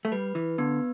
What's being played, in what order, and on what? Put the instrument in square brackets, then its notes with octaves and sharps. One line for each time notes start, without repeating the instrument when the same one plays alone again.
[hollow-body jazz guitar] A3
[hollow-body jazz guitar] G3 [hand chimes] B4
[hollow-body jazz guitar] E3
[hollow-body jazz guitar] D3 [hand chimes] B3